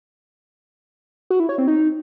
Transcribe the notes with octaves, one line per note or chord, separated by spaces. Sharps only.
F#4
E4
C#5
C4
D#4